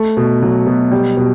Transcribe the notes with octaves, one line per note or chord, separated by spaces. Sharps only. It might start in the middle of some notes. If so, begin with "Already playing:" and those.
Already playing: A3
B2
F#3
B2
G3
B2